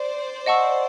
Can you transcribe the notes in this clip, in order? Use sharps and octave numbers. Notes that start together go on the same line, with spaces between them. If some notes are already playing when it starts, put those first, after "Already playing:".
Already playing: C5 D5
D#5 F#5 A5 C#6 E6